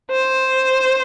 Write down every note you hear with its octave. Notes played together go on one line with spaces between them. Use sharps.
C5